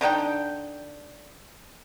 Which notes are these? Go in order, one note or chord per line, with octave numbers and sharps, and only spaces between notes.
D3 D4 D#4 G5